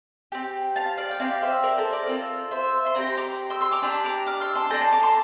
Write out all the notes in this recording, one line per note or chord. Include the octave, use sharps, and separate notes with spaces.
C4 G4
F5 A5
D5 F5
G5
C4 E4 G4 D5 F5
C5 E5
A#4 D5
A4 C5
A#4 D5
C4 F4 A4
C5 E5
C6
C4 E4 G4 G5 A#5
C6
A#5 D6
C6 E6
C6 E6
A#5 D6
D4 G4 A5 C6
A#5 D6
D6 F6
C6 E6
A5 C6
D4 A4 G5 A#5
A5 C6
A#5 D6
A5 C6